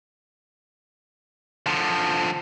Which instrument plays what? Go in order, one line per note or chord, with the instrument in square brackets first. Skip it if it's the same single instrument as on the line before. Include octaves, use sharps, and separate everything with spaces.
[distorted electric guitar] D3 F3